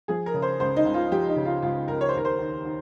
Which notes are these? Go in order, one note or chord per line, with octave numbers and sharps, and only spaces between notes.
F3 G#4
A#4
C#3
C5
C#2 C5
D#4
C#2
F4
F3 G4
D#4
C#3
F4
C#2 F4
C#2 A#4
C#5
C5
D#2 A#4
C5
D#3
D#3